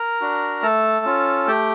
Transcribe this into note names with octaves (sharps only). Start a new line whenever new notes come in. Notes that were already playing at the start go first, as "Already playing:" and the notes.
Already playing: A#4 A#5
D4 F#4
A3 A4 A5
C#4 F4
A3 G4 G5